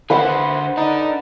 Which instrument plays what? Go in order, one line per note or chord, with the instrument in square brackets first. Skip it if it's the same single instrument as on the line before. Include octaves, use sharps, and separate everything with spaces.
[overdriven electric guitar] D3 C5 [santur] B4 F#5
[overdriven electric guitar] D4 A4 [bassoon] D#4